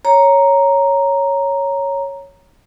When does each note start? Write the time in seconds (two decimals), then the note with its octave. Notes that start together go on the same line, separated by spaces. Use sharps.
0.05 C#5 A#5